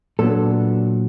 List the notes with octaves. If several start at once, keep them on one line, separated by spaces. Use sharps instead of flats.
A#2 F#3 B3 D4 A4